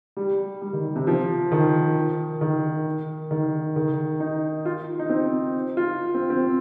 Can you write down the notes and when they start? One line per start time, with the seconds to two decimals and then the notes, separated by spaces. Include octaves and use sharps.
0.17 G3
0.62 G3
0.73 D#3
0.96 C3
1.07 F3
1.52 D#3
2.41 D#3
3.31 D#3
3.76 D#3
4.20 D#4
4.65 F4
4.99 D#4
5.10 C4
5.77 F4
6.14 C4
6.30 C4